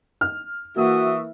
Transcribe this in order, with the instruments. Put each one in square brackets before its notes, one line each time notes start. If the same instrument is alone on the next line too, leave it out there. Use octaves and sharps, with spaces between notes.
[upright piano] F6
[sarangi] E3 [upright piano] A#3 [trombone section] F#4 [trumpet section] E5 C#6 D#6